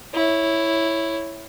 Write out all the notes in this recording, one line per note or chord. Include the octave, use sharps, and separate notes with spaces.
E4 C#5